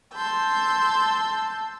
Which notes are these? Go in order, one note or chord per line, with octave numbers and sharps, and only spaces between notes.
A5 C6 E6 G6